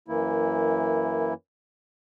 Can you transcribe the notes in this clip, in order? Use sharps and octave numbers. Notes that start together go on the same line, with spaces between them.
F#2 E3 A#3 E4